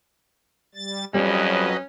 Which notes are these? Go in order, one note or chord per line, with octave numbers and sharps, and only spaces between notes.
G3 A6
F2 F#3 G3 C#4 B4 D#5